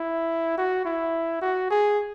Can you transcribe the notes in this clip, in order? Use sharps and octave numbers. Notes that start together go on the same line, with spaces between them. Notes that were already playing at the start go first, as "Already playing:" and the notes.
Already playing: E4
F#4
E4
F#4
G#4